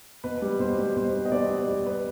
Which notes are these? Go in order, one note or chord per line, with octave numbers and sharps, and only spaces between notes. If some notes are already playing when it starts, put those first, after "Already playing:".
B2 B4
G3
B2 C5
G3
B2 C5
G3
D#5
B2 D5
G3
G3
B4